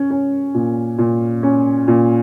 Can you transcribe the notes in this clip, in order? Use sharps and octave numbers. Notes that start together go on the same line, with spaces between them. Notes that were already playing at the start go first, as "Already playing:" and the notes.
Already playing: C#4
C#4
A#2
A#2
C#4
A#2